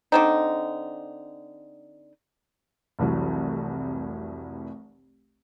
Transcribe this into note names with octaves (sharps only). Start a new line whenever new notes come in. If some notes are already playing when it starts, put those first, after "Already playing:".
D3 C4 D#4
F1 C2 E3 F#3